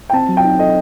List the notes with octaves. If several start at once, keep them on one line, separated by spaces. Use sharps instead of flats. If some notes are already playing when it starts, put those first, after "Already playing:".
G5
C4 A5
F#3
G5
D#4
A4 D#5